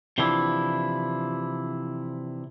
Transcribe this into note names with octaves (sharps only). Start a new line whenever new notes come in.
C3 E3 F3 D4 E4